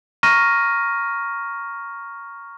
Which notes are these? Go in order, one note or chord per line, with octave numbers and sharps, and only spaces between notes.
A#5 C#6 F6 A#6 D#7